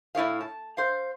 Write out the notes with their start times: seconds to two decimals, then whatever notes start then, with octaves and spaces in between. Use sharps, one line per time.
0.15 A2 E4 C#5 F5
0.41 A5
0.77 C5 F5